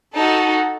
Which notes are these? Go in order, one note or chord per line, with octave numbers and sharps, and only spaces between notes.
D#4 F#4 A4 A5